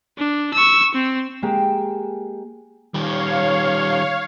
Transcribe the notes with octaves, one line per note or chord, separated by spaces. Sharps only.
D4
C#6 E6
C4
G#3 A#3 G4
D#3 G3 C#5 F5